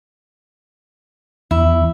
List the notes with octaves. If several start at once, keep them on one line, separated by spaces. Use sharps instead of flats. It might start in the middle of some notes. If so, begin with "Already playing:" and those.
E2 E4